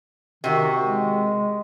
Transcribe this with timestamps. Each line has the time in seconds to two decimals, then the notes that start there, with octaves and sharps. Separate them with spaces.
0.44 C3 D#3 F#4
0.82 G#3